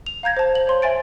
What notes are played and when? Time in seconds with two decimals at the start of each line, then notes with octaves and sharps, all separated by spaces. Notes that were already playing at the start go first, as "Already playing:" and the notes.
0.06 F7
0.23 F5 A#5 G6 G#6 A#6
0.37 C5 A5
0.55 F#7
0.67 C5 C#5 C6
0.82 E5 G#5 A6 D7